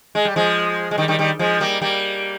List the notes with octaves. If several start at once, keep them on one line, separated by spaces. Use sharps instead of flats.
G#3
G3
F3 G#3
G#3
D#3 G3
D#3 G3
D#3 G3
F3 G#3
G3 A#3
G3 A#3